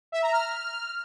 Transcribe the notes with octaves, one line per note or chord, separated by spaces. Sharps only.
E5
A#5
F6